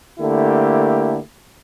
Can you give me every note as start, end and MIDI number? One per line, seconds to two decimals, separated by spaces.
0.20 1.19 50
0.20 1.19 57
0.20 1.19 58
0.20 1.19 64
0.20 1.19 67